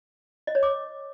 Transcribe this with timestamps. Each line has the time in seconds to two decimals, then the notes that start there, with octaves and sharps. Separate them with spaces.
0.47 D#5
0.55 C#5
0.63 D6